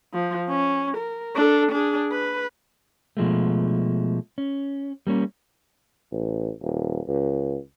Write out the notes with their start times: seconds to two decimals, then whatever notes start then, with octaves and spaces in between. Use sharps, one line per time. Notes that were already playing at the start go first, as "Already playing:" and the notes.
0.14 F3
0.50 C#4
0.98 A#4
1.35 D4 A4
1.72 D4 G#4
2.12 B4
3.17 B2 F3 G#3 A3
4.38 C#4
5.07 G3 A#3 C#4
6.12 A1
6.62 D#1
7.08 C#2